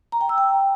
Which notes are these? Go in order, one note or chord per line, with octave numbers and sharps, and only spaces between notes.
A#5
G5
E6
G5